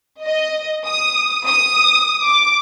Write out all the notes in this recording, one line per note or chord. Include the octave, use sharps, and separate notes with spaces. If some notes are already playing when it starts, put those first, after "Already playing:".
D#5
D#6
D#6
D6